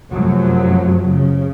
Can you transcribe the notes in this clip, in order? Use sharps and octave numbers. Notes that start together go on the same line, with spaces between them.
F#2 C3 F3 F#3 A3
C#3